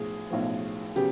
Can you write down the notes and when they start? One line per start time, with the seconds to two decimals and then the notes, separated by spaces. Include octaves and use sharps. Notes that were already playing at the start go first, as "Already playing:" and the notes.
Already playing: B1 A2 F3 G#4
0.31 B1 A2 F3
0.96 C#3 F#3 B3 G4